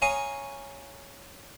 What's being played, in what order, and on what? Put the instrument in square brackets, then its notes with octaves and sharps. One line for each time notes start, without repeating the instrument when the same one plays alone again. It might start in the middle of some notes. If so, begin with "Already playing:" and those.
[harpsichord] C#5 F5 G#5 A#5 C#6 D#6